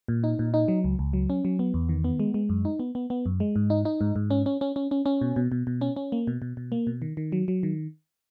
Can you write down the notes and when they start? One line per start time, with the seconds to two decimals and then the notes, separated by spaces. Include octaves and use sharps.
0.08 A#2
0.24 D#4
0.39 A#2
0.54 D#4
0.68 F#3
0.84 C#2
0.99 C#2
1.13 F#3
1.30 C#4
1.45 F#3
1.59 B3
1.74 E2
1.89 D#3
2.04 B3
2.20 G#3
2.34 G#3
2.49 F#2
2.65 D#4
2.80 B3
2.95 B3
3.10 B3
3.26 F#2
3.40 G#3
3.56 G#2
3.70 D#4
3.85 D#4
4.01 G#2
4.16 G#2
4.30 C#4
4.46 C#4
4.61 C#4
4.76 C#4
4.91 C#4
5.06 C#4
5.21 B2
5.36 B2
5.52 B2
5.67 B2
5.81 C#4
5.96 C#4
6.12 A#3
6.27 B2
6.42 B2
6.57 B2
6.72 A#3
6.87 B2
7.02 D#3
7.17 D#3
7.32 F#3
7.48 F#3
7.63 D#3